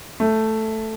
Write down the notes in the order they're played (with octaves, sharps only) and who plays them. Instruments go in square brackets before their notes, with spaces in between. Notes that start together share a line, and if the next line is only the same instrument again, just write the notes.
[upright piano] A3